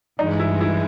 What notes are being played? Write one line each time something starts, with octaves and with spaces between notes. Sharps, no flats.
G2 E3 G#3 D#4
E4
E4